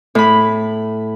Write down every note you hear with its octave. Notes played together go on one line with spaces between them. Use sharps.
A2 B5